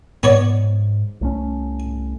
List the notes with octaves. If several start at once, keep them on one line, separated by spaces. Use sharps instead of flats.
G#2 B3 C#5 D5
C2 A3 C#4